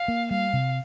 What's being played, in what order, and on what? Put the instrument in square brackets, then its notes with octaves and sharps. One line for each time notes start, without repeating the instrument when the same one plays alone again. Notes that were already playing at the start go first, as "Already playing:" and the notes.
Already playing: [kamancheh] F5
[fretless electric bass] A#3
[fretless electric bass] G3 [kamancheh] F5
[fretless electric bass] C3